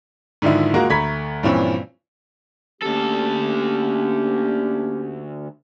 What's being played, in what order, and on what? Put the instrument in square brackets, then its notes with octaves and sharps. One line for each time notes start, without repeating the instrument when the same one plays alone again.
[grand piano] G#2 D3 D#3 F3 E4
G#3 A#3 F4 F#4 A#4
D2 A3 A#5 B5 G#6 B6
G2 A#2 E3 F3 C4 C#4
[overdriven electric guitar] D2 A4 [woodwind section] A#3 C#4 G4